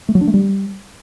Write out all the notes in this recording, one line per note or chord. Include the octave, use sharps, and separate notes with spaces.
A3
F#3
D4
A3
G3